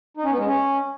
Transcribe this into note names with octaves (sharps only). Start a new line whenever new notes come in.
D#4
C#4
B3
G#3
C#4